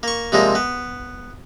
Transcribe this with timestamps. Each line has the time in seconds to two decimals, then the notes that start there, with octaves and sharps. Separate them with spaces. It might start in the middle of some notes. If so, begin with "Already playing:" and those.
0.03 A#3 C#6
0.32 C3 F3 G3 G#3 A#3
0.55 B3